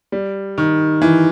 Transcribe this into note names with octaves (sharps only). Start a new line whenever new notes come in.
G3
D#3
E3